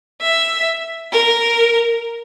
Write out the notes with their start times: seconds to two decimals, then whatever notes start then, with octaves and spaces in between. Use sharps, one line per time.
0.21 E5
1.12 A#4